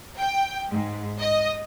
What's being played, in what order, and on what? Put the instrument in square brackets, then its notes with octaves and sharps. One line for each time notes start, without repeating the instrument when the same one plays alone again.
[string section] G5
G#2
D#5